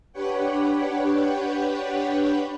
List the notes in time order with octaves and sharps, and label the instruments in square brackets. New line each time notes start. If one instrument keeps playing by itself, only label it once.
[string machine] D4 G4 B4 C#5 F#5 G5